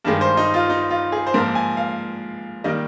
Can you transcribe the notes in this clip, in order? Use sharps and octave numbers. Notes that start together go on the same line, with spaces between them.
G2 D#3 G#3
C5
D#4
F4
D#4
F4
G#4
C5
G#2 F3 A#3 A#4
G#5
F5
D#3 G3 A#3 D#5